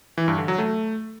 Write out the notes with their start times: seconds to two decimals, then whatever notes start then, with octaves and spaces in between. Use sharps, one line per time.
0.18 E3
0.28 G2
0.38 D3
0.48 F#3
0.58 A3